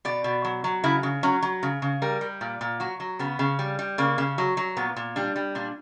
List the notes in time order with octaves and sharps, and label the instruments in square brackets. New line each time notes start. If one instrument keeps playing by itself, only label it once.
[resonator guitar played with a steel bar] B2 D5
B2
F#3
F#3
C#3 E4
C#3
F#3 C#4
F#3
C#3
C#3
G3 A#4
G3
A#2
A#2
F#3 F#4
F#3
C#3 B3
C#3
G3
G3
C#3 A#3
C#3
F#3
F#3
A#2 B3
A#2
G3 D4
G3
A#2 D4